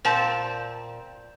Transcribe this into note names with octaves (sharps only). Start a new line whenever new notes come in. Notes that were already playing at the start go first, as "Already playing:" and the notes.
A#2 C4 A5